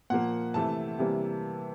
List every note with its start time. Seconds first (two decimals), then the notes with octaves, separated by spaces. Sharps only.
0.10 A#2 F3 A#3 F#5
0.54 C3 E3 A3 A5
0.99 C3 E3 G3 A#3